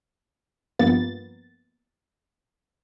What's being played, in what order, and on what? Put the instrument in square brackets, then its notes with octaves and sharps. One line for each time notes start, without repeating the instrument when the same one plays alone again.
[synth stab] G2 F3 A#3 B3 A6